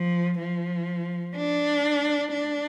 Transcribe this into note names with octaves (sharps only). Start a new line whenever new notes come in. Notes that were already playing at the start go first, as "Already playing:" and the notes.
Already playing: F3
F3
D4
D4